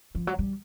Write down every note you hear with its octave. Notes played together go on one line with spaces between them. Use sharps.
F3
F#3
G3